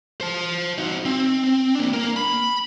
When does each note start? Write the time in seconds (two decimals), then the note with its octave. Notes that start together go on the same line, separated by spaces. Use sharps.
0.21 C5 A5
0.78 D#4 F#4
1.05 C4
1.75 A#3 D4
1.94 A#3 A#4
2.16 B5